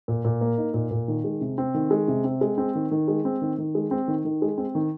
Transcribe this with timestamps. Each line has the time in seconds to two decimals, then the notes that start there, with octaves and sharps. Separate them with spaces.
0.08 A#2
0.25 A#2
0.41 A#3
0.58 D#4
0.74 A#2
0.91 A#2
1.08 D#3
1.24 G#3
1.41 C3
1.58 C4
1.74 D#3
1.91 G#3
2.08 C3
2.24 C4
2.41 G#3
2.58 C4
2.75 D#3
2.91 D#3
3.08 G#3
3.25 C4
3.42 D#3
3.58 D#3
3.75 G#3
3.91 C4
4.08 D#3
4.25 D#3
4.42 G#3
4.58 C4
4.75 D#3